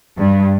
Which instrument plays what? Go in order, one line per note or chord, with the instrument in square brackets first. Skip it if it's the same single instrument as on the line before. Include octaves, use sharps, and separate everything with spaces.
[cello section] G2